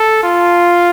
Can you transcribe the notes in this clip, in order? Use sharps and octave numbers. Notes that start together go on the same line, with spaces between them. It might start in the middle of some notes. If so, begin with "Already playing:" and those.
Already playing: A4
F4